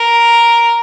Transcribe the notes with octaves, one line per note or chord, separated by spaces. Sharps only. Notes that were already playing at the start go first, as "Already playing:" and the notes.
Already playing: A#4